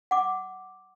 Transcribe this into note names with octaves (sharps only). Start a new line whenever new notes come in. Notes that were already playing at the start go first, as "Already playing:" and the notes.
F#5 D6